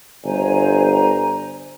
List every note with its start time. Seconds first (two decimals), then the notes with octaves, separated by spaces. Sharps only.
0.25 G1 C5 G#5 A#5